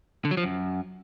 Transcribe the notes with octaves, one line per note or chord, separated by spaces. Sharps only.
D3
F#3
F3
F#2